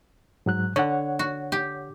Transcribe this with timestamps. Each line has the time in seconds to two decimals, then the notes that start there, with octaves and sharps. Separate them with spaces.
0.46 G#2 F#3 F#6
0.76 D3 C#5 F#5
1.19 F#4
1.52 G4